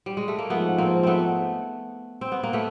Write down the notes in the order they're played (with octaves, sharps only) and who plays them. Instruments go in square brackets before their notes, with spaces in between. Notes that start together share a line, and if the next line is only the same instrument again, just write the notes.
[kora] G3
G#3
A3
A#3
[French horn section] G#2 F3 G#3 [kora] A3 B3
[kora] A#3 C4
A3 B3 C4
C4
B3
A#3
A3 B3